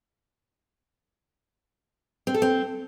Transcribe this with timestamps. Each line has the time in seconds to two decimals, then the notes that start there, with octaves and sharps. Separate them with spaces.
2.27 C4
2.34 A4
2.42 C4